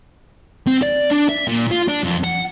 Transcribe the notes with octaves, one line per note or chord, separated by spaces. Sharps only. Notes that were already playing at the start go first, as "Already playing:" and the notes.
C4
D5
D4
E5
A#2
F4
D4
F2
F#5